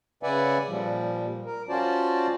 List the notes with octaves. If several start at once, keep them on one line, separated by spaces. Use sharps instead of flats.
C#3 B4 D5 E5 F#5 G#5
A#2 F3 G3
A#4
C#4 F4 F#4 C5 D5 A5